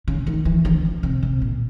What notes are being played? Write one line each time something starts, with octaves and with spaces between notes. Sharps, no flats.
C#3
D#3
E3
D3
C#3
C3
C3
A#2